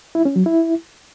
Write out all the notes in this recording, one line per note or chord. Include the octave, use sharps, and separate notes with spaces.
E4
C#4
F#3
E4